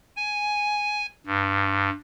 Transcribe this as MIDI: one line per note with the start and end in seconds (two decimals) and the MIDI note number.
0.17 1.06 80
1.26 1.90 43